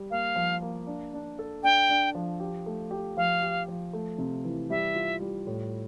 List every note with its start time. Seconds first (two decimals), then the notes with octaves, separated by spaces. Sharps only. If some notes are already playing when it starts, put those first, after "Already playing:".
Already playing: G3
0.11 A#3 F5
0.36 F3
0.62 A#3
0.87 D4
1.13 D4
1.39 A4
1.63 D4 G5
1.89 D4
2.15 F3
2.40 G4
2.66 A3
2.91 G4
3.17 F3 F5
3.42 G4
3.68 F3
3.93 A3
4.18 C3
4.45 E3
4.70 G3 E5
4.95 F4
5.20 G3
5.47 A2